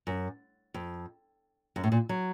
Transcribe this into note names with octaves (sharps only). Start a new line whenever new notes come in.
F#2
F2
F#2
A2
A#2
F#3